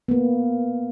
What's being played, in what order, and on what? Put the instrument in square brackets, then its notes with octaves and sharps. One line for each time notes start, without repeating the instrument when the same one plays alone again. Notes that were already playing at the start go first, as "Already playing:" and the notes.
[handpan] A#3 B3